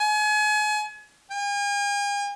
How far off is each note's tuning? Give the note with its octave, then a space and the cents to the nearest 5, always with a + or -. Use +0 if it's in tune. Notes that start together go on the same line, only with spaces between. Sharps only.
G#5 +35
G#5 -45